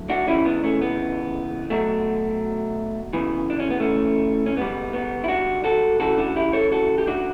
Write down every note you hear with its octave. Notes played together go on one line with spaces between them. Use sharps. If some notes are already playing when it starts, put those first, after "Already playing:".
Already playing: D2 D3 F#3
D4 F#4
C#2 C#3 E3 G3 C#4 E4
B3 D4
A3 C#4
B3
B1 B2 F#3 A3
D2 C#3 E3 B3
D4
C#4
B3
A3 C#4
C#4
C#2 B2 G3 B3
B3
E4
D4 F#4
F#4 A4
D2 C#3 E3 F#4 A4
D4 F#4
E4 G4
A4 C#5
F#4 A4
G4
D4 F#4